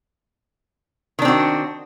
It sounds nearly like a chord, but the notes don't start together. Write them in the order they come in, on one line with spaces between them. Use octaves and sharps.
D#3 D4 C4 F#4